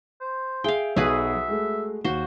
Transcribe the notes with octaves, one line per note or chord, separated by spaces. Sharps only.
C5
G#4 E5 F5 G5
B1 F#4 G#4 B4 E5
G#3 A3
D#2 F#4 C5